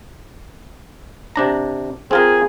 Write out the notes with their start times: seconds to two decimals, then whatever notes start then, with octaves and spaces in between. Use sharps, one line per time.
1.36 C3 D4 A#5
2.11 C4 F4 G#4 A#4